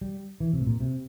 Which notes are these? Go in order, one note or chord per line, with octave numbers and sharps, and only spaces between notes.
G3
E3
C3
A2
A#2
C3